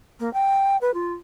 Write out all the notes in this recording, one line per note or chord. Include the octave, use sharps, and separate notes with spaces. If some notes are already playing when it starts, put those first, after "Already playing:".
A#3
G5
B4
F4